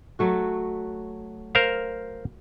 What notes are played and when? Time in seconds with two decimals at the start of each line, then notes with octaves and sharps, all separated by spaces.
0.19 F#3 A3 F#4
1.55 A#4 C5 F5